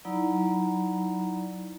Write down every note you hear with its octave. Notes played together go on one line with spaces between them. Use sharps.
F#3 D#4 E4 D5 A#5 B5